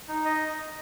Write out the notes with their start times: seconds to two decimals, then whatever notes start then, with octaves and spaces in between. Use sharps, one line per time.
0.08 D#4
0.25 D#5